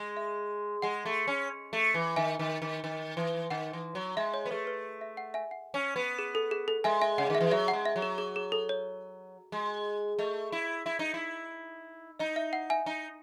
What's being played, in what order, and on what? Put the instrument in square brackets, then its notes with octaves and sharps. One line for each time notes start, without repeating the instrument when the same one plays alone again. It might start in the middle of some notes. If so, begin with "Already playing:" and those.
Already playing: [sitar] G#3
[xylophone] E5
[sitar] G#3 [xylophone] F#5
[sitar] A3
C#4
A3
E3
[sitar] D#3 [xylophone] E5 G#5
[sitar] D#3
D#3
D#3
E3
[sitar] D#3 [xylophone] F#5
[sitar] E3
F#3
[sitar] G#3 [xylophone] E5
[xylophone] C#5
[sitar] B3
[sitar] A3 [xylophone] B4
[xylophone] B4
E5
F#5
E5 G#5
F#5
[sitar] C#4
B3
[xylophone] G#4
A4
G#4
A4
[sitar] G#3 [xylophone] E5 G#5
[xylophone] E5 G#5
[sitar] C#3 [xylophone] F#5
[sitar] D#3 [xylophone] E5
[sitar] E3
[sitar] F#3 [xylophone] E5
[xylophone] F#5
[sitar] G#3
[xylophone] E5
[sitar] F#3
[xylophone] G#4
G#4
G#4
A4
C#5
[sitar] G#3
[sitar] A3 [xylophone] D#5
[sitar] E4
[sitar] E4 [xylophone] E5
[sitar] D#4
E4
[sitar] D#4 [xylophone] D#5
[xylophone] E5
F#5
E5 G#5
[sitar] D#4